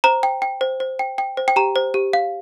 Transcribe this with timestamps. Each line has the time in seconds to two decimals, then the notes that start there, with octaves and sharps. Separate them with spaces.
0.04 C5 A#5
0.23 G5
0.42 G5
0.61 C5
0.80 C5
0.99 G5
1.18 G5
1.37 C5
1.48 G5
1.56 G4 A#5
1.76 C5
1.94 G4
2.13 F5